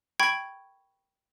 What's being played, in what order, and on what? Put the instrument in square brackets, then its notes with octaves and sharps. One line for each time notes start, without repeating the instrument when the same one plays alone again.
[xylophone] G5 B5 C#6 G#6